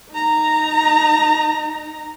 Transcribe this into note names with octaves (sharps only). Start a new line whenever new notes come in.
D#4 A#5